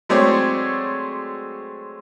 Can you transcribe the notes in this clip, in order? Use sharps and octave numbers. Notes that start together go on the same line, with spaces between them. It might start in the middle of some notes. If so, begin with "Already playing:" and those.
F#3 G#3 A3 C4 C#5 D5